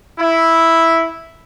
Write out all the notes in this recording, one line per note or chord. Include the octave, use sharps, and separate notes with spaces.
E4